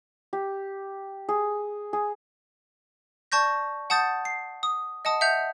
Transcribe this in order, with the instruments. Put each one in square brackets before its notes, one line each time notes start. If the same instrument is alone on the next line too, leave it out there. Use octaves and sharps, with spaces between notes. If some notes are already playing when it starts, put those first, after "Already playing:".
[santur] G4
G#4
G#4
[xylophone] D5 A5 C#6 G6 A#6
F#5 A5 D#6 G6 A6
C7
D#6
D#5 F#5 A5 D#6
E5 F#5 G6 F7